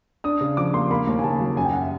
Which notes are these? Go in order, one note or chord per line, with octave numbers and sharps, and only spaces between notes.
D4 D#6
C#3
F3 D6
A#3 C6
A#3 B5
D#2
G#5
C#3 A5
F#3
F#2 G#5
G5
F#5
E5